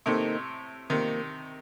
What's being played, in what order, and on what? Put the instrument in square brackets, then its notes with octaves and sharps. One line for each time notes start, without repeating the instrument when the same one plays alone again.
[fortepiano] A2 C3 [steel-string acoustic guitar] D#3 A#3 D#4 A4 C5
[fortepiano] C3 D#3 [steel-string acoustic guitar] F3 A#3